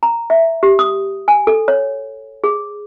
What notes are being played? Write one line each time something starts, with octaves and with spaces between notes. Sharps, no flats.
A#5
E5
G4
D#6
G#5
A4
C#5
G#4